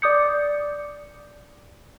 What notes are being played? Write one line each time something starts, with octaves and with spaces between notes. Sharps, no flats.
D5 D6 D#6 G6 C#7